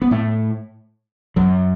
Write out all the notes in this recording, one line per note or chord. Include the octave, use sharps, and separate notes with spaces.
B3
A2 A3
F#2 F#3